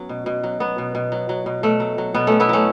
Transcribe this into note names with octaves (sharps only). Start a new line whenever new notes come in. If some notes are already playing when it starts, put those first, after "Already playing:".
Already playing: F#3 B3 C#4
B2
B2
F#3
F#3 B3
B2
B2
F#3
F#3
B2
B2 A3
F#3
F#3
B2 B3
B2 A3 C#4
B3 E4
F#3 A3 C#4